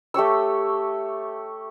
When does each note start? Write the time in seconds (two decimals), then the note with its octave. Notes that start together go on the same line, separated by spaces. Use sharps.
0.14 A3 G4 C#5 E6